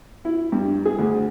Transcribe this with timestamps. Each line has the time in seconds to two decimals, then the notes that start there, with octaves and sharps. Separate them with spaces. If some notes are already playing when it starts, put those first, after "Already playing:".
0.25 E4
0.52 G2
0.85 G#4
0.99 D2